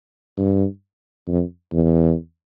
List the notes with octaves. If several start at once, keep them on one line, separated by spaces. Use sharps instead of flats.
G2
F2
E2